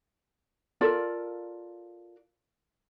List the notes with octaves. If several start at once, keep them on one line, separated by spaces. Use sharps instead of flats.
F4 A4 A#4 D5